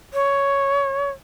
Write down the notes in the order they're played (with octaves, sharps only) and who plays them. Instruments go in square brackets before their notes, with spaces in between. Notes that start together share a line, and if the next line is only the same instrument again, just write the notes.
[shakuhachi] C#5